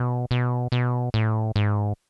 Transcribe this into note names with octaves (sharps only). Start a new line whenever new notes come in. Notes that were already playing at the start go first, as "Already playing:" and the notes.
Already playing: B2
B2
B2
A2
G#2